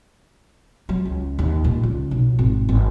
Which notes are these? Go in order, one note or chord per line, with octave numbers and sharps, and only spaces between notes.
F#3
C#2
D#2
A#2
C#2
B1
G#1
G#1